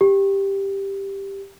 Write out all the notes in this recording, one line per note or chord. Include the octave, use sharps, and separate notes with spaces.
G4